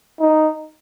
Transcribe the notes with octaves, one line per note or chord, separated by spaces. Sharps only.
D#4